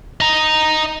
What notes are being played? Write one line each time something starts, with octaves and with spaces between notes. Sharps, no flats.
D#5 A#5